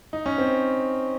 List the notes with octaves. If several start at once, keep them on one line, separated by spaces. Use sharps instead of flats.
D#4
C#4
C4